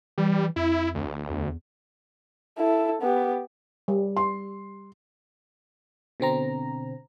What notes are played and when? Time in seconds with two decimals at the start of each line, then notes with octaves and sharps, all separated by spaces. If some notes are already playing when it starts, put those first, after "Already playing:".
0.18 E3 G3
0.56 F2 E4
0.95 D2
1.30 E2
2.59 E4 A4
3.02 B3 G4
3.88 G3
4.17 C6
6.20 B2 D3 C4 A#5